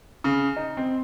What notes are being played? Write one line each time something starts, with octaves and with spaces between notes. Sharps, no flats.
C#3
D#4
C4